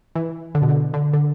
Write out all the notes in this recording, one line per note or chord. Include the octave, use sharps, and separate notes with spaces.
E3
D3
B2
D3
D3
D3